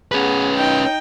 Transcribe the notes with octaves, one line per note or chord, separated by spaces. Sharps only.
B3 C#4 G#4 B4
D#4 G5